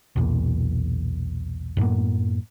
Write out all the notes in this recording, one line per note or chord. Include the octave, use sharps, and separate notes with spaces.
B1 E2 A#2
F#2 A2 A#3 B3